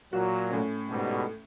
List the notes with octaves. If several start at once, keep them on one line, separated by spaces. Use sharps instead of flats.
A#2 F#3 F#4
A2 C#4
G#2 B2 G3